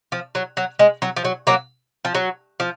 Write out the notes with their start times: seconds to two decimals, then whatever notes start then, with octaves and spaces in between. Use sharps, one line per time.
0.12 F3
0.35 F#3
0.57 F#3
0.79 G#3
1.02 F#3
1.17 F3
1.25 F#3
1.47 F#3 A#3
2.05 F3
2.15 F#3
2.60 F3